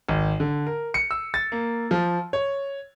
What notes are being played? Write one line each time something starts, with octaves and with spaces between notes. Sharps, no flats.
G#1
D3
A#4
C#7
E6
A6
A#3
F3
C#5